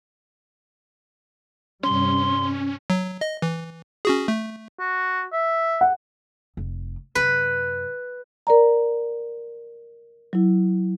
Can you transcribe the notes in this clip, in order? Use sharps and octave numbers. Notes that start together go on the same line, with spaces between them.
G2 C3 G3 C#4 C6
F#3
D#5
E3
C#4 F#4 G#4
A3
F#4
E5
F#5
F1
F#2 C3 B4
A#4 D5 A#5
F#3 E4